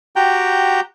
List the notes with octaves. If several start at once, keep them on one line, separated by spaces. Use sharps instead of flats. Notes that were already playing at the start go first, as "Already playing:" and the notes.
F#4 G4 G5 A#5 G6